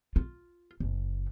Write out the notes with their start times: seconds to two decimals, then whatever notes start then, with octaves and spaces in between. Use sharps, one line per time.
0.16 F4
0.80 F#1